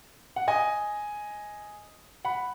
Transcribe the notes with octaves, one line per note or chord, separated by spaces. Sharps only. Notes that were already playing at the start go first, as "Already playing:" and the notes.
F#5
D#5 G#5
F#5 B5